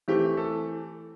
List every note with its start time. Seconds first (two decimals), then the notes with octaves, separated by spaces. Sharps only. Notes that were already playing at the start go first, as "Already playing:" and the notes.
0.08 E3 A3 C4 G4
0.37 A4